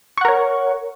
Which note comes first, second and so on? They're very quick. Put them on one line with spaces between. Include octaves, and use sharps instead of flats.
C#6 F#5 A#4 C#5